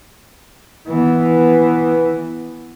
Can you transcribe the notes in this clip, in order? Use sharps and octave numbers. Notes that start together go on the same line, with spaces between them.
E3 B3